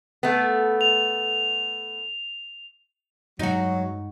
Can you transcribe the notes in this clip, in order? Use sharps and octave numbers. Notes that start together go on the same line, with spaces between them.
A3 B3
F7
G2 F#3 G#3 D#4 F#4